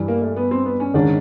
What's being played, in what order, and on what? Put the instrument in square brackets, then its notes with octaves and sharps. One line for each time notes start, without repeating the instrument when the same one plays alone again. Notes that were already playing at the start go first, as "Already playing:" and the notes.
Already playing: [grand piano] G2 E3 G3
[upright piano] A#3
A3
B3
C4
B3
C#4
[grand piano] G#2 D#3 G#3 C#4 [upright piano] D4